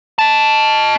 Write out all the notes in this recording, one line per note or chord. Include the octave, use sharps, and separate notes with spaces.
D#5 A5